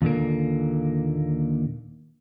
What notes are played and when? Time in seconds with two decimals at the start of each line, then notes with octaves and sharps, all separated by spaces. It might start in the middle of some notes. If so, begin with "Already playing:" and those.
0.02 D#2 A#2 D3 A#3